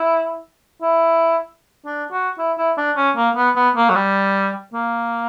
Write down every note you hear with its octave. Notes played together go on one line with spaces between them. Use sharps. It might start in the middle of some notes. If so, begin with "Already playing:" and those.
Already playing: E4
E4
D4
F#4
E4
E4
D4
C#4
A#3
B3
B3
A#3
F#3
G3
A#3